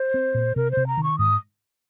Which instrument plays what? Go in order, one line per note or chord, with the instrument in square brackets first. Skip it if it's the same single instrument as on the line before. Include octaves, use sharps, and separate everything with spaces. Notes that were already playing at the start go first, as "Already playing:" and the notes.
Already playing: [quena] C5
[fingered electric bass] C4
A#2
[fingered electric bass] C3 [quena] A#4
[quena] C5
[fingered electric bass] C3
[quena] A#5
[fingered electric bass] D#3
[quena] C#6
[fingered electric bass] G#2 [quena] D#6